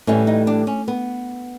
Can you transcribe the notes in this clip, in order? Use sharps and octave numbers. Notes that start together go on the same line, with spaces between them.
A2 E3 G3 C#4
D#4
D4
C#4
B3